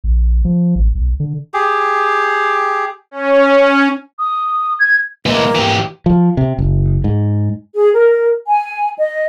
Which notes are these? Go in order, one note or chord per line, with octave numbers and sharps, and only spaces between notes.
A#1
F3
A1
B1
D3
G4 G#4
C#4
D#6
G#6
E3 G#3 A#3
E3 G4
F3
C3
F#1
G#2
G#4
A#4
G#5
D#5